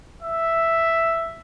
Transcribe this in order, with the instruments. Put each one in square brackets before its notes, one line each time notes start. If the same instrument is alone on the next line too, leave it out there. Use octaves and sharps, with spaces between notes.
[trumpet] E5